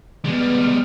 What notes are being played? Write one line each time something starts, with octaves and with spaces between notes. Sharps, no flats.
G3 G#3 B3 F6